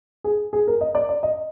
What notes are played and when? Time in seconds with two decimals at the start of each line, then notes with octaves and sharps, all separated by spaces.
0.24 G#4
0.53 G#4
0.68 A#4
0.81 D#5
0.95 D5
1.09 D5
1.23 D#5